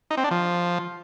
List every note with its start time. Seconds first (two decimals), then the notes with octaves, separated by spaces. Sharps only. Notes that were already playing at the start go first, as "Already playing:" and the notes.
0.11 D#4
0.17 C4
0.24 D4
0.31 F3